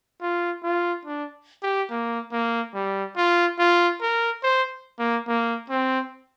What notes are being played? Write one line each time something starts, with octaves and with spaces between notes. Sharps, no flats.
F4
F4
D4
G4
A#3
A#3
G3
F4
F4
A#4
C5
A#3
A#3
C4